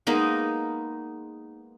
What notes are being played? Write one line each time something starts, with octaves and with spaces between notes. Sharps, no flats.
G#3 A#3 B3 D#4